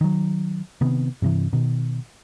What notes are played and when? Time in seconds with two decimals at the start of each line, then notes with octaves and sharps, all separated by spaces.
0.01 D#3 F#3
0.81 C3 D#3 B3
1.22 G2 C3 E3
1.53 B2 D#3